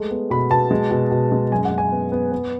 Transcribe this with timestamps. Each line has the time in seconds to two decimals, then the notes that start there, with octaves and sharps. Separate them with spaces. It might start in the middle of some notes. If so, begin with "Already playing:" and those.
Already playing: G#3 A3
0.11 B3
0.30 B2 B5
0.50 B2 A5
0.71 G#3
0.91 B2
1.11 B2
1.32 G#3
1.52 F#2 G#5
1.65 F#5
1.72 F#2
1.78 G#5
1.92 B3
2.12 B3
2.32 B3